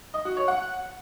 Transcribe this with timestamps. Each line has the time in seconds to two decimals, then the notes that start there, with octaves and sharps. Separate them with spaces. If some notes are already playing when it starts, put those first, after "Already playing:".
0.14 D#5
0.25 F#4
0.37 C#5
0.48 F#5